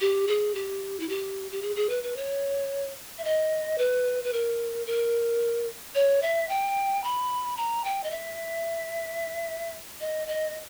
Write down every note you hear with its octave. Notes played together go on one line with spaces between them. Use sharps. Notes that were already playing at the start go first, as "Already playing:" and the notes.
G4
G#4
G4
E4
G4
G4
G#4
G#4
B4
B4
C#5
E5
D#5
B4
B4
A#4
A#4
C#5
E5
G5
B5
A#5
G5
D#5
E5
D#5
D#5